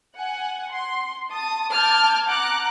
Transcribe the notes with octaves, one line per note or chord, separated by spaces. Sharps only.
F#5 G#5
C6
A5 D#6
A5 D6 F6 G6 G#6
F#5 A#5 D6 F#6